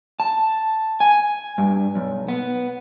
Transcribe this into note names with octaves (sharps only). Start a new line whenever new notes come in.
A5
G#5
G2
B1
B3